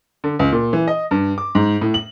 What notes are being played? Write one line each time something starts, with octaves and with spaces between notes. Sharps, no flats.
D3
C#2
A#2
E3
D#5
G2
D6
G#2
A2
F#7